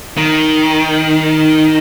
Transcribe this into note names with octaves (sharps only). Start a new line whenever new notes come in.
D#3